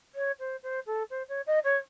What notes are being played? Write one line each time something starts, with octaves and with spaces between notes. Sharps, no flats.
C#5
C5
C5
A4
C5
C#5
D#5
C#5